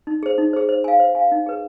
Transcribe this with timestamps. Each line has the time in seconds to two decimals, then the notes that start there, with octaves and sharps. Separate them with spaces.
0.07 D#4
0.23 G#4 C5
0.38 D#4
0.53 G#4 C5
0.69 C5
0.84 F5 G#5
1.00 C5
1.15 F5 G#5
1.32 D#4
1.46 G#4 B4